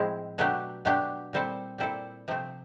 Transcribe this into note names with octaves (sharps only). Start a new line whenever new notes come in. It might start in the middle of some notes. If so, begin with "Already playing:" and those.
Already playing: A2 F3 G#3 C4 E4
B2 F#3 A3 D4 G4
B2 F#3 A3 D4 G4
A#2 G3 C4 E4 A4
A#2 G3 C4 E4 A4
C3 F3 A3 C4